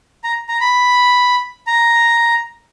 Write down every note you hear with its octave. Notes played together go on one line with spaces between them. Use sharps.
A#5
A#5
B5
A#5